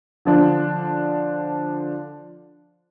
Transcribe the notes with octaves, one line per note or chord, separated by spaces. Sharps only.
D3 F3 D4